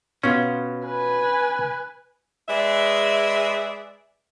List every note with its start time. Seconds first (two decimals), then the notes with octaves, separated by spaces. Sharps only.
0.23 B2 C#4 F4
0.86 B4 G#5
2.48 G#3 G#4 B4 D5 E5